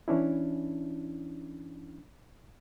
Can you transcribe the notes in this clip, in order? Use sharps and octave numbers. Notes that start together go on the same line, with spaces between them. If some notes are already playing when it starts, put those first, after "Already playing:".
E3 C#4 D4 E4